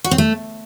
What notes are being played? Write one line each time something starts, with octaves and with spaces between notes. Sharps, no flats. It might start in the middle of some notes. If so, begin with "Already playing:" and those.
F#4
C4
A3